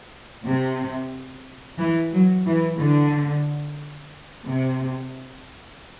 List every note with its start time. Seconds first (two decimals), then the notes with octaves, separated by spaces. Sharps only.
0.46 C3
1.79 E3
2.13 F#3
2.46 E3
2.80 D3
4.46 C3